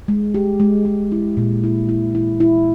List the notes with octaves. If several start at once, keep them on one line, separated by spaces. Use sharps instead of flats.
G#3
G4
G#3
G#3
E4
A#2
E4
E4
E4
E4